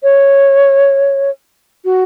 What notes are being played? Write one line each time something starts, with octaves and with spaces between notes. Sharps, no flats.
C#5
F#4